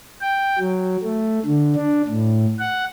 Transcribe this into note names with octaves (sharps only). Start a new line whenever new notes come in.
G5
F#3
A3
D3
D4
A2
F#5